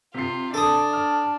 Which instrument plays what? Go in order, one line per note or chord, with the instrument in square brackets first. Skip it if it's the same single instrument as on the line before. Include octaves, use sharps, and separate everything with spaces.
[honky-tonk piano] C3 C7 [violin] F4
[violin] D4 [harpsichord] A4 D#6 [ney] A5
[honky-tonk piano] F6